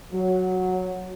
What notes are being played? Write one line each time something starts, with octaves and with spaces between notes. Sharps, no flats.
F#3